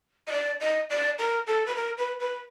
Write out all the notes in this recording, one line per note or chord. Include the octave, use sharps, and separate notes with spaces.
D#5
D5
D#5
D5
A#4
A4
B4
A#4
B4
B4